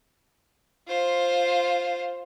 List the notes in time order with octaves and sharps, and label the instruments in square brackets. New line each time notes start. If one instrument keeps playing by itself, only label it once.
[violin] F4 C5